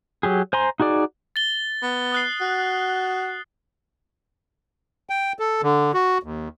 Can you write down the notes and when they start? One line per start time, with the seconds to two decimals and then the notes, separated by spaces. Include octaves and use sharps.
0.23 F#3 G4 G#4
0.53 C5 G#5 A#5 C6
0.80 D#4 F#4 G#4 D5
1.36 A6 G7
1.83 B3
2.12 D#6 F#6 C7
2.41 F#4
5.10 G5
5.39 A4
5.63 D3
5.94 F#4
6.23 D#2